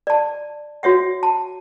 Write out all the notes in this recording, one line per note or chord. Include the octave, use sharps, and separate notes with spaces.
D5 A5
F#4 C#5 E5 F#5
A5